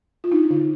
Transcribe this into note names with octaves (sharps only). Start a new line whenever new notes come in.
F4
D4 D#4
D3